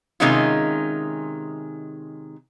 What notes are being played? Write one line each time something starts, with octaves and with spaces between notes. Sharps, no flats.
C3 D#3 G#3 C#4 D#4 F4